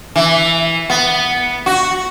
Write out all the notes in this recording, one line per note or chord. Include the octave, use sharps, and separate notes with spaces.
E3
B3
F#4